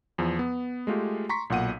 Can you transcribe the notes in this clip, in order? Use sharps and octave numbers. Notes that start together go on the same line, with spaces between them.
E2 F3
B3
G#3 A3 F4 G4
A#5 C6 C#6 B6
B1 A#2 F#5 D#7